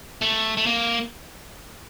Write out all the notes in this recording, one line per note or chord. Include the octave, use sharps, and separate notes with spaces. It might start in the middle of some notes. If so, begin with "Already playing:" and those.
A3
A3
A#3